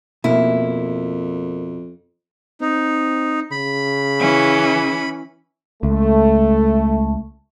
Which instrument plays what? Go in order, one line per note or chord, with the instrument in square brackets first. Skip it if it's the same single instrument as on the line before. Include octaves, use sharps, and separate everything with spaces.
[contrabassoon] F2 [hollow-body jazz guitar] B2 [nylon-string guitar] A#3 [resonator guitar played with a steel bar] E4
[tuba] C4 [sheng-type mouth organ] D#4
[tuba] C#3 [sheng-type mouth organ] B5
[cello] E3 C#4
[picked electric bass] C#2 [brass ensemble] A3